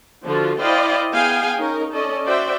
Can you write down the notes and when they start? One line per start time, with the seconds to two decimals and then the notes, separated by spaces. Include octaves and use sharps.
0.24 D3 F3 F4 F#4
0.59 E4 C5 D5 D#5 F5 G5
1.13 B3 G#4 F5 G5 G#5
1.56 C#4 D#4 A#4
1.92 C#4 A4 D5 D#5
2.25 F#4 C5 D5 E5 G5